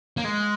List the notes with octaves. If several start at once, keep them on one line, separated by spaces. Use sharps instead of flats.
A#3
G#3